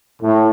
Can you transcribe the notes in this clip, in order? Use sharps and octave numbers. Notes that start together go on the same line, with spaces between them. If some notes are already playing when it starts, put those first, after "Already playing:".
A2